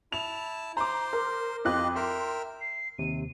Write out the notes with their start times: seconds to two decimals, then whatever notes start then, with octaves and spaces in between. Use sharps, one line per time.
0.12 E4 A5 F7
0.77 C5 A#5 C6 D6
1.13 A#4
1.65 F2 F4 G4 D#5 F#6
1.96 A#4 E5 G5 C6
2.61 C7
2.99 D#2 C3 D#7